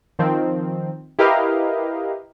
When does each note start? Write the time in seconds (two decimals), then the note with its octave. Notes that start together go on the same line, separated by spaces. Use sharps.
0.19 D#3 F3 C4
1.19 E4 G4 A#4 B4 D#5 F5